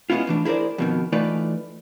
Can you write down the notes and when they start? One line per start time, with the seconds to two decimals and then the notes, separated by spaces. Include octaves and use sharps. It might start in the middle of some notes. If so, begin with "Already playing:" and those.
0.10 G#3 B3 C#4 E4 F4
0.27 A2 E3 D4
0.45 E4 G#4 A#4 C5 D5
0.78 F2 B2 D#3
1.12 E3 A3 D#4 F4 B4 D5